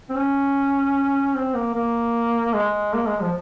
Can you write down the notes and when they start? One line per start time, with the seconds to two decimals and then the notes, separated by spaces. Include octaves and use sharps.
0.10 C4
0.15 C#4
1.35 C4
1.54 A#3
1.74 A#3
2.54 G#3
2.94 A#3
3.07 G#3
3.21 F3